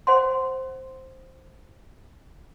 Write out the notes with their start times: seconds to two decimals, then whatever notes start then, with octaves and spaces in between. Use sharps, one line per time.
0.07 C5 F#5 C6